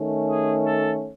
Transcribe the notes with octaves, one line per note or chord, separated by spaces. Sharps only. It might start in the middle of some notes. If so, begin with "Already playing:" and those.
Already playing: D#3 A3 C#4
G#4
A4